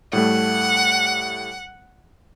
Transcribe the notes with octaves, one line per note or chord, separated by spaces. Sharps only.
A2 G3 A3 F#5